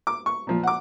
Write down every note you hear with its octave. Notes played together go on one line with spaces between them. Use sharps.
D6
C#6
A#2 F3
F#5 D6